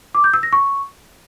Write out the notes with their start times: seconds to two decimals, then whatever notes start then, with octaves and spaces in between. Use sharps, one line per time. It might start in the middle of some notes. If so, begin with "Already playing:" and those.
0.15 D6
0.24 G6
0.34 E6
0.43 A#6
0.53 C#6